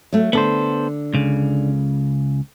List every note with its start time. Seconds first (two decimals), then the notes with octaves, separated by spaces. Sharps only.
0.13 F#3 A3
0.33 D3 B3 A4 C5
1.14 C#2 C#3